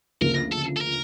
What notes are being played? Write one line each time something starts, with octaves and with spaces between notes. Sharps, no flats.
D2 C#3 F3 A#3 A#4
A4
A4
A#4